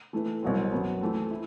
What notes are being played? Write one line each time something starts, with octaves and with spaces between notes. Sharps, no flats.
E3 A3 E4 B4
C2 B2 F#3 C4
F#2 F#3 B3
E3 A3 C4
E4